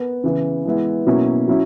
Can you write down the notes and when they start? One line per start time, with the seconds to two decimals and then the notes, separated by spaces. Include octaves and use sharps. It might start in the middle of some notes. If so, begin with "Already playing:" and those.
Already playing: B3 A#4
0.24 C#3 E3 B3
0.65 E3 G#3 B3 E4
1.06 B2 F#3 A#3 C#4 E4
1.47 F#3 C#4 E4